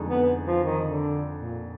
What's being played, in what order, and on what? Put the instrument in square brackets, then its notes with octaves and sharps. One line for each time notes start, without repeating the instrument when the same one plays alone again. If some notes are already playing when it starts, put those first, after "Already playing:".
Already playing: [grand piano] F2 D3 G#3 D#4
[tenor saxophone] B3
F3
D#3
D3
A#2